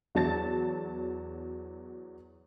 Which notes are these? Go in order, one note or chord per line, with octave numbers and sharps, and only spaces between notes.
E2 F#3 A5 A6